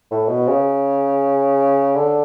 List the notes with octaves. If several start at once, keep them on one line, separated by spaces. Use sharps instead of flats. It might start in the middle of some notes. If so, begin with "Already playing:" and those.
A2
B2
C#3
D3